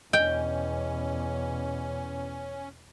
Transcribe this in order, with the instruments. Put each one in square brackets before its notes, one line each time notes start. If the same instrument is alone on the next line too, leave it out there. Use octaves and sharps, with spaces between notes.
[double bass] E2 B2 [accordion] C#4 [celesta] D#5 [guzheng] G5